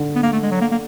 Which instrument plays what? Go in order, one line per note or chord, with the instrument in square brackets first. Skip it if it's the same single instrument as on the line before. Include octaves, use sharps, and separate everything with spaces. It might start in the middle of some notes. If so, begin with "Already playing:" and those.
Already playing: [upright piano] D3
[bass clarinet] B3
A#3
A3
G#3
F#3
A#3
A#3